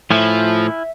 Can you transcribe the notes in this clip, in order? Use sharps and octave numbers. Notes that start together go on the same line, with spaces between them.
A2 F3 E4 E5 G#5 F6